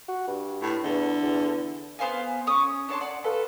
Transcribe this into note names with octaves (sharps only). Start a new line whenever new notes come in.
F#4
G2
A2
E2 D3
E2
B3 C5 F5 G#5
C#4 C#5 D#6
D4 C#5 A5 C6
D5 F#5
F4 A4 B4